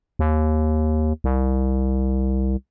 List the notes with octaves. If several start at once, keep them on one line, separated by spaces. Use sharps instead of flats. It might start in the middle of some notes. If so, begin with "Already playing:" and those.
D#2
C2